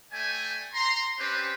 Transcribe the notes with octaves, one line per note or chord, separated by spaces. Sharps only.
A3 D5 G5 G#5
A#5 C6
C4 C#4 G4 B4 C5 D5